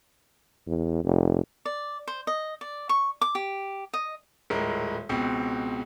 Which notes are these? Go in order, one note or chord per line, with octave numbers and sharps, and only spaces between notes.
E2
F1
D5
C5
D#5
D5
C#6
D6
G4
D#5
D#1 A2 G#3 A#4
C#2 B2 C4